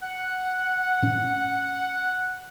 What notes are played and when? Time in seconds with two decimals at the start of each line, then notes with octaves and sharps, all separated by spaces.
0.02 F#5
1.02 A2 C#4